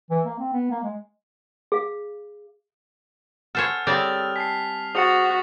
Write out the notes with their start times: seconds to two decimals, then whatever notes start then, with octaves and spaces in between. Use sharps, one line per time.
0.10 E3
0.26 A#3
0.39 C4
0.52 B3
0.71 A#3
0.83 G#3
1.72 G#4 F5
3.55 A4 C5 C#5 F#5 G#5 F6
3.87 G3 C4 G#4 A4 C#5 D5 F7
4.36 G#5 A5 B6 C7
4.95 F#4 G#4 C5 F#5 A6 C#7 F7